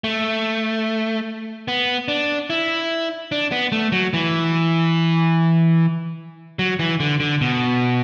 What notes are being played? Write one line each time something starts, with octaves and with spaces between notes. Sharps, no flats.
A3
B3
D4
E4
D4
B3
A3
F#3
E3
F#3
E3
D3
D3
B2